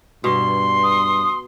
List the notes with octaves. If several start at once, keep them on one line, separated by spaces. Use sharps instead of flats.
G2 B2 C6
D#6